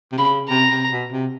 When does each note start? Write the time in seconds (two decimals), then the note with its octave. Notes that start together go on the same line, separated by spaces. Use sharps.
0.12 C3
0.18 C#3 B5
0.49 C3 A#5
0.71 C3
0.91 B2
1.12 C3